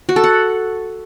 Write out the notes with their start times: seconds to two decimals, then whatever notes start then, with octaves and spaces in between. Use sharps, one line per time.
0.09 F#4
0.16 A4
0.24 F#5